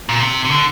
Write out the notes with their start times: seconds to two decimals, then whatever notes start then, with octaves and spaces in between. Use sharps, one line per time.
0.09 A#2
0.20 C3
0.45 C3
0.51 D3